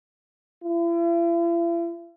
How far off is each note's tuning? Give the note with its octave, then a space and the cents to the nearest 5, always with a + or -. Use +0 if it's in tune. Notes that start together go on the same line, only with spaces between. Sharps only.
E4 +45